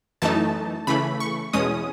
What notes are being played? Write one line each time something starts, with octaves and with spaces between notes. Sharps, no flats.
F#2 E3 A3 D#4 A5
C#3 E3 A3 B5
C#6
E2 B2 G#3 C#4 D#6